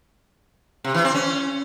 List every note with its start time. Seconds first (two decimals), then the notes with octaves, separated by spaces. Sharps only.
0.84 C3
0.94 E3
1.04 C4
1.15 C#4